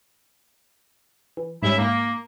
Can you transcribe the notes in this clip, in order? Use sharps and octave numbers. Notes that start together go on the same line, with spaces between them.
E3
G#2 G3 C#4 E4 E5
G#2 A#3